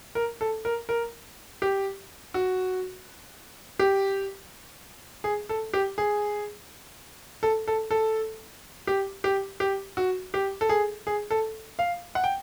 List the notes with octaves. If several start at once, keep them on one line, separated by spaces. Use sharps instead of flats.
A#4
A4
A#4
A#4
G4
F#4
G4
G#4
A4
G4
G#4
A4
A4
A4
G4
G4
G4
F#4
G4
A4
G#4
G#4
A4
F5
F#5
G5